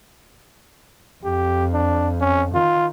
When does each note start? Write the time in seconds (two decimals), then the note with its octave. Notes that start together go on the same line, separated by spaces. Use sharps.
1.24 F2 G4
1.73 D4
2.20 C#4
2.55 D#3 F4